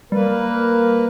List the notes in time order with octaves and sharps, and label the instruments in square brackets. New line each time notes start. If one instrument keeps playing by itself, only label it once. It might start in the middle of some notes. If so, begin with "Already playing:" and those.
[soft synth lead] G3 [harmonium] A#3 B4